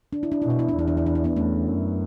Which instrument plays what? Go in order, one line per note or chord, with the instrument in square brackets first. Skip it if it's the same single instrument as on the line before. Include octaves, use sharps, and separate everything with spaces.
[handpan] D4
E4
D4
[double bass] B2 [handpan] E4
[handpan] D4
E4
D4
[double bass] E2 [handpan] E4
[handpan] D4
E4
D4
E4
B3 D4
[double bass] E2 [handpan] A3 C#4
[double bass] F#2